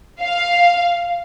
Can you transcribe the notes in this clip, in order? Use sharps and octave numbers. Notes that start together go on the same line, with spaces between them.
F5